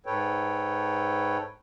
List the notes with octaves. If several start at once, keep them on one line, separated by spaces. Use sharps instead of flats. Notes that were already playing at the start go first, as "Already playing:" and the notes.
G#2 A4 B4 C#5 G5